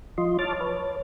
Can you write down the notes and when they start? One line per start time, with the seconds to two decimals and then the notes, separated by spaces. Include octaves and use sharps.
0.18 F3 F4 D#5 C6
0.39 C#5 A5 D6 F6 A6
0.61 B4 C#5